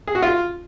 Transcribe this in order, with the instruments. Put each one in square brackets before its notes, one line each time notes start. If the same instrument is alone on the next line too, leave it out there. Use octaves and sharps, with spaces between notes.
[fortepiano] G#4
F#4
F4